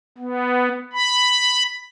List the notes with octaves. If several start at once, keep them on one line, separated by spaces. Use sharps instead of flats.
B3
B5